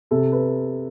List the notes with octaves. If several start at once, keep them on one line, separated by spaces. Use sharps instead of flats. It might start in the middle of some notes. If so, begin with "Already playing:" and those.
C3 A4
B4